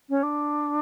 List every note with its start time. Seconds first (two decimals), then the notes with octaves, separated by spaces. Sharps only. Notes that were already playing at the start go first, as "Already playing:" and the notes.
0.10 C#4
0.23 D4